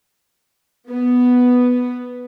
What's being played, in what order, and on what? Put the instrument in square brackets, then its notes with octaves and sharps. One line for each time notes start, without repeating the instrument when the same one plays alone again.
[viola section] B3